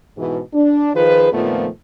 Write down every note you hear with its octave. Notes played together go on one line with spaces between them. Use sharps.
G#2 B2 E3
D4
D#3 F3 F4 G#4 B4
F2 A#2 D#3 F3 A3 B3